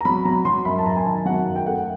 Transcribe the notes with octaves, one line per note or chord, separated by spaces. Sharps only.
A#5
F#3 B5
F#3 A#5
F#3 C6
F#2 B5
A5
F#2 A#5
G#5
D#3 A5
F#3 F#5
F#2
G5
A3 F#5